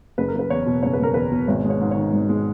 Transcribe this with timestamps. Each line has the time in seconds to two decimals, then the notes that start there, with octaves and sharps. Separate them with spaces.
0.18 F#1 B4
0.28 A#4
0.35 F#1 B4
0.50 E2 C#5
0.66 B2
0.83 F#1 C#5
0.93 B4
0.99 F#1 A#4
1.14 E2 B4
1.32 B2
1.48 G#1 C#5
1.65 G#3
1.70 C#5
1.81 G#2
1.91 C#5
1.97 D#3
2.13 G#1
2.29 G#3